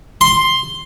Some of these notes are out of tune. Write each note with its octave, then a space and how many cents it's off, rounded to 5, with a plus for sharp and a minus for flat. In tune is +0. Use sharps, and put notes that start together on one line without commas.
C6 +5